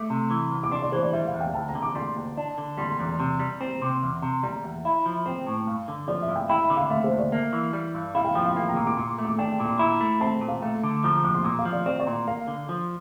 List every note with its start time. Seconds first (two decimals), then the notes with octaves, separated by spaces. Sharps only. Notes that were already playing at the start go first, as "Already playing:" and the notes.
Already playing: A3 D6
0.10 C3
0.30 E3
0.51 C2
0.63 D6
0.71 D4 C6
0.82 D5
0.92 E3 C5
1.02 D5
1.13 G3 E5
1.27 F5
1.33 E2
1.40 G5
1.54 D2 A5
1.68 A#5
1.75 D3
1.82 D6
1.95 G3 C6
2.16 D2
2.38 D4
2.58 D3
2.78 G3 C6
2.90 A#5
2.99 E2 C6
3.20 C3
3.39 G3
3.61 C4 A#5
3.82 C3
4.03 E2
4.22 C3
4.43 G3 A#5
4.64 E2
4.85 E4
5.06 F3
5.26 C4 G5
5.47 A2
5.67 G2
5.88 D3
6.08 F3 D5
6.22 E5
6.28 G2
6.35 G5
6.50 E4 G5
6.63 E5
6.70 D3
6.77 F5
6.90 A3 E5
7.04 C5
7.11 D2
7.18 D5
7.32 A#3 E5
7.53 E3
7.73 G3
7.95 G2
8.15 E4 F5
8.24 G5
8.35 F3 G5
8.45 F5
8.56 A#3 G5
8.68 A#5
8.76 A#2 C6
8.87 D6
8.97 A#2 C6
9.18 A3
9.25 D6
9.38 D4 G5
9.60 A#2
9.65 C6
9.79 E4 A#5
10.01 A3
10.20 C4 A5
10.41 A#2
10.48 F5
10.62 A3
10.83 D3
11.03 F3 A#5
11.24 F2 D6
11.34 C6
11.44 A#2 A#5
11.59 F5
11.65 F3
11.72 D5
11.86 C4 D5
12.00 D5
12.07 A#2
12.27 A#3 F5
12.48 D3
12.69 F3